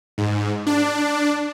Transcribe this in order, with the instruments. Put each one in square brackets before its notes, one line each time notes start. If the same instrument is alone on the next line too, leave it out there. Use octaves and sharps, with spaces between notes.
[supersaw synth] G#2
D4